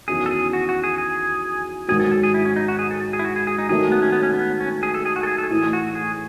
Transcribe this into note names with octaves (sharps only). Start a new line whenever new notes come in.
E2 D#3 F#3 C#4 E4 G#4
A4
G#4
F#4
F#4
G#4
G#4
G#2 D#3 F#3 G#4
A4
A4
G#4
E4
C#4
D#4
F#4
G#4
A4
G#4
E4
F#4
G#4
G#4
D#4
D#3 F#3 A3 G#4
B3
C#4
B3
C#4
B3
C#4
G#4
A4
G#4
F#4
A4
G#4
A4
A2 E3 A3 G#4
F#4
G#4